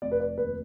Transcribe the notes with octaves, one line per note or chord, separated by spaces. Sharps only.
F1 D5
B4
D5
D#2 B4